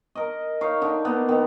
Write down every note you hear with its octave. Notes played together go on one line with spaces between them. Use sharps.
A#4 D#5
D#4 C#5 F5
D3 D#4
A#3 B3
D#3 B3